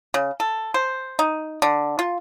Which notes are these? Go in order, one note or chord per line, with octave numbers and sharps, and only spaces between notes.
C#3
A4
C5
D#4
D3
F4